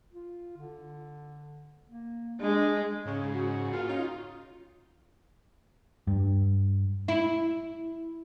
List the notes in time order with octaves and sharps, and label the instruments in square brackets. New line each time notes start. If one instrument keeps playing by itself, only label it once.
[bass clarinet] F4
D3
A#3
[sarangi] G#3 [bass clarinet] D4
[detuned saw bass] G#2 [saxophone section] C#3
[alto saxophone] F#4
[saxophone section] A#2 F5 [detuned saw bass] F4
[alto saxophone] C#4 [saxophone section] D#4
[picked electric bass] G2
[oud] E4